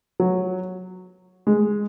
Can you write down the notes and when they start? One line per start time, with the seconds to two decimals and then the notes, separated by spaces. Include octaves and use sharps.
0.20 F#3
1.47 G#3